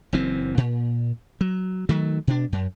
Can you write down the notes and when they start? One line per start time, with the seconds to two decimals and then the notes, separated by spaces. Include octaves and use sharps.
0.13 F#1 F#2 E3 C4
0.57 A#2
1.41 F#3
1.89 D#3 F#3 A3
2.27 B2 D4
2.52 F#2